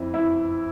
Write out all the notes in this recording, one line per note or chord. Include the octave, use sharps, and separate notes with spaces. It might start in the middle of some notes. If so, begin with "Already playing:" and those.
Already playing: F2 E4
E4